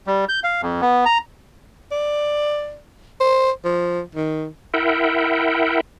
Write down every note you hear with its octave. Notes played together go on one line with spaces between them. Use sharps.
G3
G6
F5
F2
B3
A#5
D5
C5
F3
D#3
E4 A#4 E5 F#5 G5